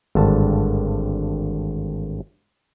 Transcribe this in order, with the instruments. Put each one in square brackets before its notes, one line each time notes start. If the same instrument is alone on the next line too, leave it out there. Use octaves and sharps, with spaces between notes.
[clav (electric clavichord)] G#1 G2 D3 A5